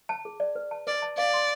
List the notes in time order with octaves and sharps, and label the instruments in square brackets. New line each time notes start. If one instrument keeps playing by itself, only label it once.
[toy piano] A5
G#4
D5
B4
A5
[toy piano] B4 [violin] D5
[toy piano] A5
[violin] D5 [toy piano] F5
[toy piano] C6